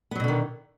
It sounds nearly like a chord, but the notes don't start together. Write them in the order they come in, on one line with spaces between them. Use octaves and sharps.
B3 F#3 B2 D3 D#3